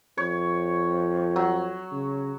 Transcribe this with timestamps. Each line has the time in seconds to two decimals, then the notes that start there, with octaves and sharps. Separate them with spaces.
0.18 F2 C#5
1.36 F#3
1.91 C#3